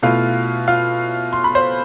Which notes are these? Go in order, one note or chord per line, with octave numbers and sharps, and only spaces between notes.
B2 A3 E4 F4 F5
F4 F5
C6
B5
C5 C6